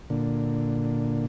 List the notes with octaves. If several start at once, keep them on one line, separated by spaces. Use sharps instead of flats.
A#2 D3